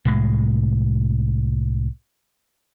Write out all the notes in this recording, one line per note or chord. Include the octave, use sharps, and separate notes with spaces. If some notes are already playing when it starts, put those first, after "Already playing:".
C2 A2 G#3